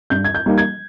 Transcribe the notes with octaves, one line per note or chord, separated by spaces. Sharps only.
G2 G6
G#6
G6
G3 A#3 D#4
G#6